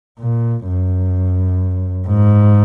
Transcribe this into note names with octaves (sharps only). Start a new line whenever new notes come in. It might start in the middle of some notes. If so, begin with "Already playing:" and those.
A#2
F#2
G#2